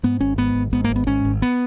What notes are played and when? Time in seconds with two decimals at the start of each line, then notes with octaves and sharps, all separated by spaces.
0.03 G#2 B3
0.20 G#1 C#4
0.38 G#2 B3
0.55 G#1
0.73 G#2 B3
0.84 A#3
0.90 G#1
0.96 B3
1.07 G#2 C#4
1.25 G#1
1.42 B3